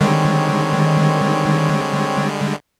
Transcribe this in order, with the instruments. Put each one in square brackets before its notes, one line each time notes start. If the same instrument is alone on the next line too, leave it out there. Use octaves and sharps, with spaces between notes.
[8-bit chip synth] D3 G3 G#3 [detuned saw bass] D#3 [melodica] C4 C#5